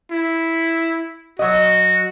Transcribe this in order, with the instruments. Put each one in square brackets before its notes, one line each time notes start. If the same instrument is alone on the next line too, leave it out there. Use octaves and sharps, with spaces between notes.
[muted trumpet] E4
[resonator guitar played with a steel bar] F#3 D#5 [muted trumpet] F#4